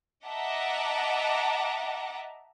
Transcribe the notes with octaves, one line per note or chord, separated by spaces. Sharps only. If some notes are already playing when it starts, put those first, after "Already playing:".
D#5 E5 F#5 A5 A#5 D6